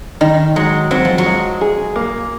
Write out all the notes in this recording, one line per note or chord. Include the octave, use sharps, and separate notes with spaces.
D#3 D#4
F#3 G#3
F#3 C4
F3
F#3
G#3
G#4
A#3